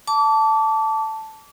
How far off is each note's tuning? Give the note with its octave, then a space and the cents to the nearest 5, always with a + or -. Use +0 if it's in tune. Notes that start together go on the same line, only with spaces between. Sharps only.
A5 +0 D6 -30